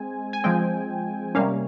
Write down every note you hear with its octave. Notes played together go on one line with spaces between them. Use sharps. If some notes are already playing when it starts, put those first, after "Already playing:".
Already playing: G#3 C4 G#5
G#5
F3 G#3 C4 G5
C3 G3 A#3 C#4 F5